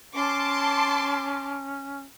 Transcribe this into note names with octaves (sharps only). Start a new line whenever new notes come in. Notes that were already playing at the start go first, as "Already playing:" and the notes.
C#4 A5 C6 D6